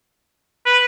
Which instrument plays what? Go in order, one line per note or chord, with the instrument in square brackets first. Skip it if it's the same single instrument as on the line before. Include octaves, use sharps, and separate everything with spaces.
[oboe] B4